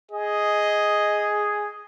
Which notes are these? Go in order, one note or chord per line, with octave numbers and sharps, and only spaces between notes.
G#4 D#5